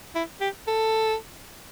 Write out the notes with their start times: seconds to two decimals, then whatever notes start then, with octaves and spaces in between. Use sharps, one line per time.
0.15 E4
0.41 G4
0.67 A4